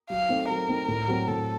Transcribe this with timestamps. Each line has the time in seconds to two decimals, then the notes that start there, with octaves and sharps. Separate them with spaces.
0.10 F#3 F5
0.29 A3 C4 D#4
0.49 F#3 A#4
0.69 A3 C4 D#4
0.88 A2
1.08 F#3 C4
1.28 A2 A4